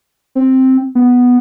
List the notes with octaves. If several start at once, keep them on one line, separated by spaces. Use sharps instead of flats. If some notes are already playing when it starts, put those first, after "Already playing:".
C4
B3